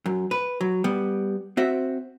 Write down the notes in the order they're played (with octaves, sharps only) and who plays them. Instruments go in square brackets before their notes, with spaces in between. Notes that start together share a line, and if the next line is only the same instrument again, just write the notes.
[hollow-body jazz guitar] F#2
B4
F#3
G3 B3
C4 F#4 E5